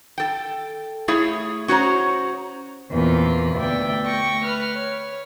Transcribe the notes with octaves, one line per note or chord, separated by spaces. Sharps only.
A4 G5
A3 E4 G#4 C#5 E5
C#4 F#4 C5 C#5 A#5
E2 A#2 A#3 C4 F4 B5
D2 B3 D5 E5 G5
A3 G5 C#6 A#6
B4 F6
C#5